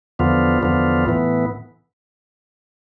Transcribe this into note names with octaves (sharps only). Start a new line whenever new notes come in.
E2 D3 F3 B3 F4
E2 D3 F3 B3 F4
A2 E3 B3